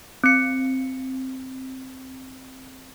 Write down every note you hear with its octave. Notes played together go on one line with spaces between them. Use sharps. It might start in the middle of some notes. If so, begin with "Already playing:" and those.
C4 C#7